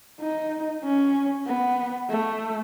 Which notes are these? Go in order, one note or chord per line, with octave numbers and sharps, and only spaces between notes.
D#4
C#4
B3
A3